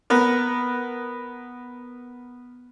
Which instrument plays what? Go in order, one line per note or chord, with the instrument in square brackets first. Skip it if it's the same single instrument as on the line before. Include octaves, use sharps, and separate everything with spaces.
[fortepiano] B3 A#4